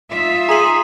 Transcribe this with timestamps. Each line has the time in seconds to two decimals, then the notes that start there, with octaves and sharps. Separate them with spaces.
0.10 D#4 F4 E5
0.49 G#4 A#5 C6